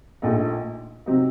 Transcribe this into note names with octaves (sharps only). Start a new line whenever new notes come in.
A#1 A#2 A3 D#4
C3 F#3 C4 D#4